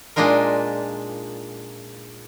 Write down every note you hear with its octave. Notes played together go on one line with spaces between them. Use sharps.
A#2 G#3 D4 D#4 F4 A#4